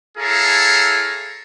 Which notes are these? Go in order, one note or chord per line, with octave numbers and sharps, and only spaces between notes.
E4 G#4 A4 C#5 F5 A#5